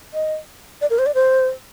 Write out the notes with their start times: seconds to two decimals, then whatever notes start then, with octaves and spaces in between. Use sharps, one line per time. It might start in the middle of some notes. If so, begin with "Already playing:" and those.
0.14 D#5
0.81 D5
0.90 A#4
0.99 C5
1.06 D5
1.15 C5